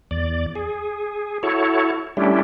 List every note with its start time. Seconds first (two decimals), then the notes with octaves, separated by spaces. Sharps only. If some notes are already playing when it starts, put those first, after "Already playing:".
0.11 E2 D5
0.55 G#4
1.43 E4 F#4 A4 C#5
2.17 G3 A3 C#4 D4 E4 G4